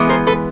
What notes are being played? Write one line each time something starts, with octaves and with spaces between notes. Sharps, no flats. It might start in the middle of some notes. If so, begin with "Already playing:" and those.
Already playing: E3 G#3 B3
A#4 C5
A4 B4